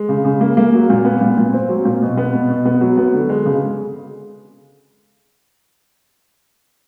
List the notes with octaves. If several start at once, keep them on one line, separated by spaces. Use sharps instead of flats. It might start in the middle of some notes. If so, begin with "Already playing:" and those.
Already playing: G#3
C#3
C#3
A#3
A#3
F#3
A#2
B3
A#2
A#2
C4
F#3
A#2
B2
B3
B2
B2
B3
F#3
B3
D3
G#3
C#3